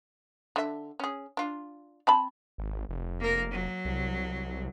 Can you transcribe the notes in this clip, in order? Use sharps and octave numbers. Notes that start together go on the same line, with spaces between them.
D3 E5
C#4 G#4
D4 F4
C4 A5 B5
G#1
F1
A#3 A#4
F#3
C2